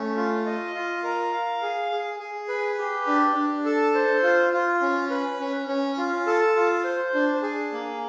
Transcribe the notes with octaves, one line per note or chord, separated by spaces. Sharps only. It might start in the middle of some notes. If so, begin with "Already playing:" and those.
Already playing: A3 C#4
F4
D#5
F4
A#4
F5
G#4
G#4
G#4
B4
G4
D4
D4
A4
C5
F4
F4
C#4
B4
C#4
C#4
F4
A4
F4
C5
D4
G#4
A#3